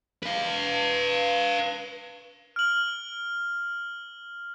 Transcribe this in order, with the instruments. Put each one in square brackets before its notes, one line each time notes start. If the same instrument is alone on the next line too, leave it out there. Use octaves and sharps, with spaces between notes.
[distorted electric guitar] B4 F5
[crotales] F6 F#7